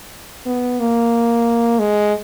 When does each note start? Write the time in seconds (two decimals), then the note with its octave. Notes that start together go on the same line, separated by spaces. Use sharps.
0.46 B3
0.80 A#3
1.79 G#3